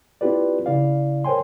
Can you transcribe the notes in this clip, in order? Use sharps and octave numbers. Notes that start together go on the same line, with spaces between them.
C4 E4 F4 G4 B4 D5
C#3 E4 D5 F5
A#4 C5 C#5 G5 G#5 C6